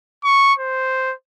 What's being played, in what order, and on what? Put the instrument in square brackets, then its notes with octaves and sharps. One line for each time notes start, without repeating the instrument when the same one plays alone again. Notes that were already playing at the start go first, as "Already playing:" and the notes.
[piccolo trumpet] C#6
C5